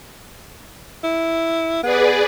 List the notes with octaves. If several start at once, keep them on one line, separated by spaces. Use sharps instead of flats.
E4
B3 G#4 B4 D5